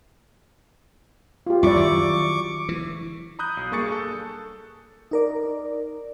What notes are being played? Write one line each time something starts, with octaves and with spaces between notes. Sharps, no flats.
F4 G4
F#2 G3 E4 D5 C#6 D6
D#3 F#3
E3
A#5 B5 D#6 F#6 G6
B1
G2 A#3 G#4 C#6 A6 C#7
A4
D#4 A#4 D5